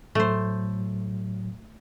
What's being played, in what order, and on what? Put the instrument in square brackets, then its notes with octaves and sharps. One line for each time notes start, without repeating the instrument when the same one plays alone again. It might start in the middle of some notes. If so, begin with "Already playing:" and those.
[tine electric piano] A2 F#3 [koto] A3 C5